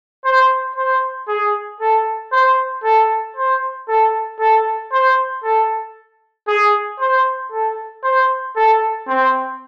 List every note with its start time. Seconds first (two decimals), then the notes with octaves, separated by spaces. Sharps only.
0.25 C5
0.76 C5
1.28 G#4
1.81 A4
2.32 C5
2.83 A4
3.36 C5
3.88 A4
4.39 A4
4.92 C5
5.43 A4
6.48 G#4
7.00 C5
7.52 A4
8.03 C5
8.56 A4
9.08 C4